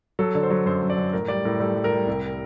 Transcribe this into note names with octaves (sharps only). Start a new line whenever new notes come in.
F#3 A4
D3
C5
F#3
F#2 C5
F#2
D5
F#2
A2 A#4
G3 D5
A2 A#4
G3 A4
G3
A#4
G3
C2